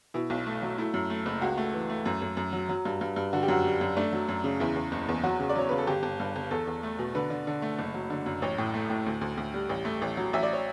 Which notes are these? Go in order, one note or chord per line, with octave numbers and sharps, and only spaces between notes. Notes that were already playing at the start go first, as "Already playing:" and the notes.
B2 E4
B1
A3
F#3
A3 E4
F#2
A3
F#1
C#2 F#4
A3
E3
A3
F#2
F#2
F#2
F#3
F#3
G2
G2
G2
D3 F#4
G4
F#2 F#4
G3
F#2
A3 D4
F#3
F#2
C#3
E2 E4
E2
F#1
E2
F#3 F#4
C#3
D5
F#3 C#5
C#3 B4
A4
G1 G4
G1
G2
G1
E2 A4
E2
A3
B2
D3 B4
D3
D3
A3
F#1
F#3
D3
F#2
A1 C#5
A2
A3
A2
D2
D2
D2
G3
A1
A3
A1
F#3
A1 E5
D5
C#5